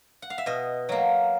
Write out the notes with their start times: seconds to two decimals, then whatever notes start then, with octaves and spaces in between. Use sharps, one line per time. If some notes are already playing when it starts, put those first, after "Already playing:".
0.22 F#5
0.30 F5
0.38 E5
0.46 B2 D#5
0.89 F#3 A#3